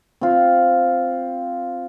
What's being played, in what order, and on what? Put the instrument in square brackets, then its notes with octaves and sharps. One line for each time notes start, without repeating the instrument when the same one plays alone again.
[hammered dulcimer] C4 F4